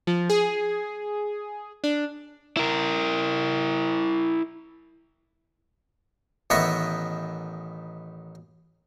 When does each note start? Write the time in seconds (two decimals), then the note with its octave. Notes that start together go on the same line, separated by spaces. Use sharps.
0.07 F3
0.30 G#4
1.84 D4
2.57 E4 A#4
6.50 A1 D#3 B3 D#5 E5 C#6